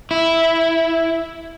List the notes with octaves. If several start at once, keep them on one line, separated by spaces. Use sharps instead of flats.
E4